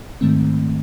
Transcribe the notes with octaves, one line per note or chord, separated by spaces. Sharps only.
G#2 D#3 A3 C4